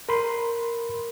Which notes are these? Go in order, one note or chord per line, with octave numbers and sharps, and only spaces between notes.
A#4 B5 C6